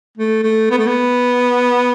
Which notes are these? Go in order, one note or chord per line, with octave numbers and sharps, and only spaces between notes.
A3
A3
B3
A3
B3